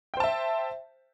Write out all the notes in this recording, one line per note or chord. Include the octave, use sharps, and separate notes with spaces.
C5 E5 G5 A5